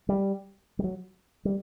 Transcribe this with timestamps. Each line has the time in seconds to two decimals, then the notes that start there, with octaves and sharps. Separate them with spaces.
0.09 G3
0.79 G3
0.84 F#3
1.45 G3